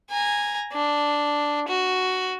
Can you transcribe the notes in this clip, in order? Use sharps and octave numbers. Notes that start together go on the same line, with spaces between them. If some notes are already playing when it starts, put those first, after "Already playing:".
G#5 A#5
D4
F#4